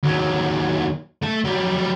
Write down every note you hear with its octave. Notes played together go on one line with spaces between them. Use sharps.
D#2 F#3
A3 A5
F#3 G3